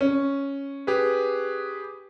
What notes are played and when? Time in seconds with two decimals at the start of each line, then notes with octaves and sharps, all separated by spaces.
0.01 C#4
0.87 G4 G#4 B4